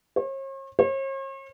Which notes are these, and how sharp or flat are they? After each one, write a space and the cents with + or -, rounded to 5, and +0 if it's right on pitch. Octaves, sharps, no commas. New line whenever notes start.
C#5 -45
C#5 -45